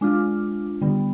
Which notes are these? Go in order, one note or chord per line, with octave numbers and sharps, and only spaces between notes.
G#3 D4 F4
D3 G3 B3